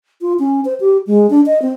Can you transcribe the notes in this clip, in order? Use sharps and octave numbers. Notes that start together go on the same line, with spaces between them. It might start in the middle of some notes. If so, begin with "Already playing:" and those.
F4
C#4
C5
G4
G#3
D4
D#5
C4